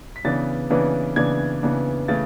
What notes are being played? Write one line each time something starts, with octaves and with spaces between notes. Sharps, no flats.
B6
C#3 E3 B3 D4 A6
C#3 E3 B3 D4
C#3 E3 B3 D4 G#6
C#3 E3 B3 D4
C#3 E3 A3 C#4 A6